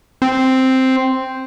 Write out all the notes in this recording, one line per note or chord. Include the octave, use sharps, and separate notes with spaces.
C4